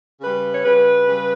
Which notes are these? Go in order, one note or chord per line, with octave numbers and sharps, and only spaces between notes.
C#3 G3 B4
C#5
C#3 G3 B4
C#3 G3